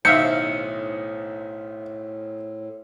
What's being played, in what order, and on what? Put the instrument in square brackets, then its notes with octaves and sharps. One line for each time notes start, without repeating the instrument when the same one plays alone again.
[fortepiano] B1 D#3 D#4 [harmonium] A2 [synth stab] C5 E5 F5 [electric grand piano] C#7